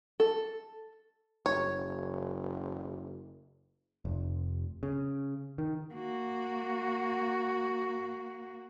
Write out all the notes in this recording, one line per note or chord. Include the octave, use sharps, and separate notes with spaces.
A4
F#1 C#5
F1
C#3
D#3
A#3 F#4